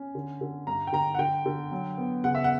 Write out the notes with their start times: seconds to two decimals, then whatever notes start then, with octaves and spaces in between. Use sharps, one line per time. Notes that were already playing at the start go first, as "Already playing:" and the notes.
Already playing: C#4
0.15 D3
0.41 D3
0.67 G2 A#5
0.87 G5
0.93 D3 A#5
1.15 F#5
1.19 D3 G5
1.46 D3
1.72 F#3
1.98 B3
2.24 C#3 F#5
2.35 E5
2.44 F#5